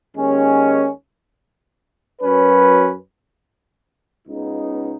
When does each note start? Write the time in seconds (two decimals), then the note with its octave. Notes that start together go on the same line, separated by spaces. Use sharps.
0.16 D#2 D#3 G#3 C#4
2.22 F#2 F#3 C#4 B4
4.28 C#2 C#3 B3 D#4